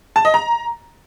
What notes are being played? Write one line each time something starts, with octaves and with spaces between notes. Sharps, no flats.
A5
D#5
A#5